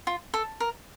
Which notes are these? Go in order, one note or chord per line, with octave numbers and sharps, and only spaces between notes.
F4
A4
A#4